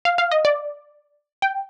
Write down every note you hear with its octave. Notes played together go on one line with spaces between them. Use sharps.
F5
F5
D#5
D5
G5